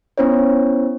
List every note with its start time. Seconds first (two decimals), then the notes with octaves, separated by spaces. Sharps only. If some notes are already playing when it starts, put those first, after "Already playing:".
0.18 B3 C#4 E4 C5 C#5